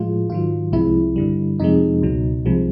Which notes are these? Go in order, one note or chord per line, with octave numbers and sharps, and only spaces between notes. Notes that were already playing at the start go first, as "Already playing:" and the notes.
Already playing: A2 F3 G#3 F4
G#2 D#3 F#3 F4
C2 C3 F3 G#3 E4
G2 D3 G3
F2 C3 F3 G#3 D#4
C#2 B2 F#3
C2 C3 F3 G#3